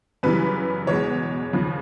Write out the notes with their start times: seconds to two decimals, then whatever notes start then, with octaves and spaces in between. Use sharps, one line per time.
0.23 F#2 C#3 E3 G3 B4
0.87 E2 B2 G#3 C#5
1.53 D#2 C#3 F3